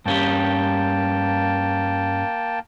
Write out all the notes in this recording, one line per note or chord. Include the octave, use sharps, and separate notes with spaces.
G2 A#3 C#4 G4 G5 A5